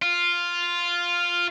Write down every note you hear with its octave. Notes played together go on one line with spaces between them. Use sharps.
F4